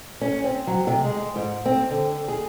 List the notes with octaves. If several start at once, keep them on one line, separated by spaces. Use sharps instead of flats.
C#4
C4
F#3
C3
G#3
G#2
C4
D3
G#4